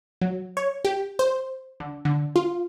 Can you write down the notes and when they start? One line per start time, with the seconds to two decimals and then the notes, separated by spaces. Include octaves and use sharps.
0.21 F#3
0.57 C#5
0.85 G4
1.19 C5
1.80 D3
2.05 D3
2.36 F4